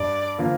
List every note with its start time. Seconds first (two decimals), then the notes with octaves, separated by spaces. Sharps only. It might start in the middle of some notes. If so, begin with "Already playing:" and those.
Already playing: G2 D5
0.38 D3 F3 A#3 F4